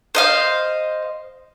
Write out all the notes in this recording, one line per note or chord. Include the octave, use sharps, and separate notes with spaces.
C5 D#5 F5